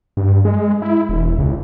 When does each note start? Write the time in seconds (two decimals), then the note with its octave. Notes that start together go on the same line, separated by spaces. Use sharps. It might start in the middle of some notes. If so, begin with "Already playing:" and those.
0.17 G2
0.45 G#3
0.82 E4
1.09 E1
1.39 C#2